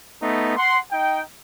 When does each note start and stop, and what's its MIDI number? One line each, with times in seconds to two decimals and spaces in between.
0.23 0.54 57
0.23 0.54 59
0.23 0.54 63
0.57 0.78 78
0.57 0.78 84
0.92 1.22 63
0.92 1.22 79